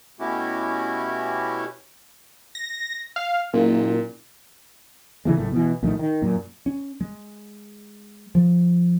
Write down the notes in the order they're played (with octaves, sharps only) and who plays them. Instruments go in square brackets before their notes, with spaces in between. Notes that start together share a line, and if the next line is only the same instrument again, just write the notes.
[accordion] B2 A3 C#4 E4 F#4 G4
[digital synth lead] A#6
F5
[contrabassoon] F#1 [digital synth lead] A#2
[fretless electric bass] A2 C#3 E3 G#3
F#1 A2 A3
B2 E3
A#1 A2 D#3 A3
D#3
F#2 A#2
[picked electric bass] C#4
G#3
F3